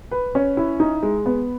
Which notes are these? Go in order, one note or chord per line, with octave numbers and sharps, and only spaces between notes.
B4
C#4
E4
D#4
G#3
B3